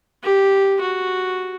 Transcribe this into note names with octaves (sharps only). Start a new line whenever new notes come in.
G4
F#4